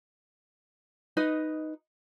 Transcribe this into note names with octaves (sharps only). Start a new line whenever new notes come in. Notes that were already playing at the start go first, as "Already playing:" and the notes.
D#4 B4 D#5